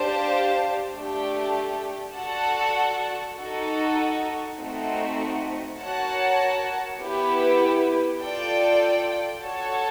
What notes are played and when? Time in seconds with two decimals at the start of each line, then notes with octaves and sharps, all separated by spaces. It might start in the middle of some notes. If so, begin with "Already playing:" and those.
Already playing: D4 G4 C5 F5 A5
0.94 A3 D4 G4
2.15 F#4 A4 D5 F#5 A5
3.37 D#4 F#4 A4
4.58 A3 C4 D#4 F#4
5.79 F#4 A#4 C#5 F#5 A5
7.01 B3 E4 G4 B4
8.22 F4 A4 D5 G5
9.43 F#4 A4 C#5 F#5 A5